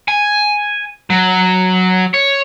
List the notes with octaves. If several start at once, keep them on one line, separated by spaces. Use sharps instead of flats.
G#5
F#3
C#5